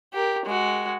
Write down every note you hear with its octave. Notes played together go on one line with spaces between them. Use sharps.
G4 A#4
G#3 F#4